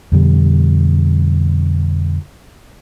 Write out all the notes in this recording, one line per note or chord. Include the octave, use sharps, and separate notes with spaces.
F2 B2 D3 G3